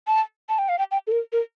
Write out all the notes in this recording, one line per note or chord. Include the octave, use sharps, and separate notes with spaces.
A5
A5
G5
F5
G5
G5
A4
A#4
A#4